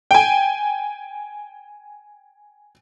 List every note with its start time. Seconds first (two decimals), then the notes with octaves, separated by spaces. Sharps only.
0.11 G5 G#5